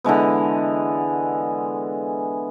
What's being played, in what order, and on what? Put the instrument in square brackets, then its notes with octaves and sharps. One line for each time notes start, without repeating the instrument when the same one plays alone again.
[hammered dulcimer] D3 E3 G#3 B3